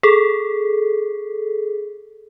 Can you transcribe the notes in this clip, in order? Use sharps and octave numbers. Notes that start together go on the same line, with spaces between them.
G#4 A4